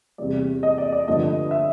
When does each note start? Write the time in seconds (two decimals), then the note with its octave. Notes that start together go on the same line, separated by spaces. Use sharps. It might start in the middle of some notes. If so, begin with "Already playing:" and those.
0.18 E2 C3 E3 G3 D5
0.63 D#5
0.78 D5
0.92 D5
1.08 G2 D3 F3 A3 D#5
1.51 E5